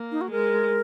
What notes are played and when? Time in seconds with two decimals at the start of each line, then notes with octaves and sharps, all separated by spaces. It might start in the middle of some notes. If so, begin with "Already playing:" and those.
Already playing: A#3
0.12 D#4
0.21 F#4
0.31 G#3 A#4